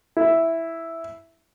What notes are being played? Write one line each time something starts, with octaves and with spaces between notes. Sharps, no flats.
E4